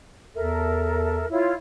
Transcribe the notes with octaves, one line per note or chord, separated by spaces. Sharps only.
E2 A4 A#4 E5
E4 F4 C#5